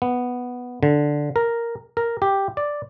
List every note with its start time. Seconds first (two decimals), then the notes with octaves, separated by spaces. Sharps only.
0.02 B3
0.83 D3
1.36 A#4
1.97 A#4
2.22 G4
2.57 D5